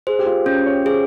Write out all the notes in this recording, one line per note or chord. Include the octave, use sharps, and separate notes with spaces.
G#4 C5
G4
F4
C#4 G4
C#5
G#4 C5